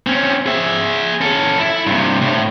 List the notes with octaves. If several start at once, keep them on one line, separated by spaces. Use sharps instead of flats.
C4 C#4
G#4 E5
C#4 A4
E4
G2 C3
A2